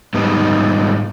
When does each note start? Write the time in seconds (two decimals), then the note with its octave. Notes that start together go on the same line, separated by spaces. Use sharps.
0.14 G#2 G3 B3 D#4